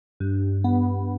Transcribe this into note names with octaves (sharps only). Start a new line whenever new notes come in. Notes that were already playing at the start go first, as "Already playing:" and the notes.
G2
B3